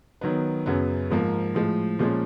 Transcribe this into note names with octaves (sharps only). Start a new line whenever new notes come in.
D#3 F#3 B3
F#2 C#3 F#3 B3
G#2 F3 A#3
A2 F3 G#3
A#2 F3 G#3 C#4